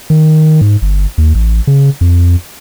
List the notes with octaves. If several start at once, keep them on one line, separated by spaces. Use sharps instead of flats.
D#3
G#2
G1
D#2
A1
C#3
F2